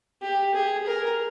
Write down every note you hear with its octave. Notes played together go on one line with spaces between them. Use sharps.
G4
G#4
A#4